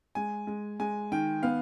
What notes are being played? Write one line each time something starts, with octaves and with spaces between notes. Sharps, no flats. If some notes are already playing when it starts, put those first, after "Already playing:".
G#3 G#5
G#3
G#3 G#5
D#3 G5
B3 F5